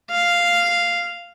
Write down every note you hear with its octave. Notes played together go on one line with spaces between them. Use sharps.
F5